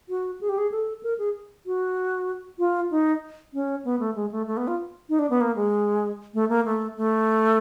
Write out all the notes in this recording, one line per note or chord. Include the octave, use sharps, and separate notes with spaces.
F#4
G#4
G4
G#4
A4
A#4
G#4
F#4
F4
D#4
C#4
B3
A3
G#3
A3
A3
B3
F4
D#4
D4
B3
A#3
G#3
A3
A#3
A3
A3